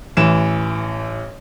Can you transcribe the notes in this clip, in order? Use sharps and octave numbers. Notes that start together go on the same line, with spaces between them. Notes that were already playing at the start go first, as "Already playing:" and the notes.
A1 E3 E7